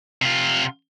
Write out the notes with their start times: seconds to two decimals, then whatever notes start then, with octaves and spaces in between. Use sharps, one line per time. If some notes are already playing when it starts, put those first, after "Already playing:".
0.22 C3 F4